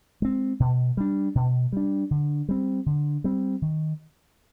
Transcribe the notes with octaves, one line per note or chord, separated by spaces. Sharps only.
G#3 C4
B2
G3 D4
B2
G3 D4
D3
G3 C4
D3
G3 C4
D#3